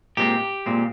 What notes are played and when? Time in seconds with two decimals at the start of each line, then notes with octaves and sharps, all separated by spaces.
0.17 A#2 G#3 C4 G4
0.66 A#2 G#3 C4